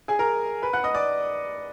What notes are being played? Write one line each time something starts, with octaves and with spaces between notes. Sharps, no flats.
G#4 G#5
A#4 A#5
B4 B5
F#5 F#6
D#5 D#6
D5 D6